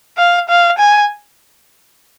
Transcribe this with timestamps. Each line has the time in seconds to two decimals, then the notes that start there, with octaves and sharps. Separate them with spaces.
0.18 F5
0.49 F5
0.79 G#5